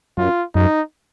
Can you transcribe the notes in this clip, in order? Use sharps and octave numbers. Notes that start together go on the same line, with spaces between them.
F#2 F4
F#2 D#4